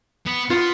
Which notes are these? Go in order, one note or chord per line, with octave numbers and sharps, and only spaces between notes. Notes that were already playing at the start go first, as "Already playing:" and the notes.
B3
B3 F4